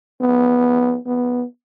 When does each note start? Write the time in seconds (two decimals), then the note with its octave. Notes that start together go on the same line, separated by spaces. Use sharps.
0.21 B3
1.06 B3